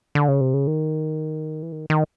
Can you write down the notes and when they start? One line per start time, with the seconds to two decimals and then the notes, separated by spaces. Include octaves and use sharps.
0.15 D3
0.28 C#3
0.41 C3
0.54 C#3
0.67 D#3
1.63 E3
1.72 D#3
1.90 D#3